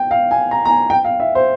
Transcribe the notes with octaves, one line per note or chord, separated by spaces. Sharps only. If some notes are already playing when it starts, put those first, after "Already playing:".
Already playing: G5
F5
G#5
A#5
A#5
G#5
G5
F5
E5
C5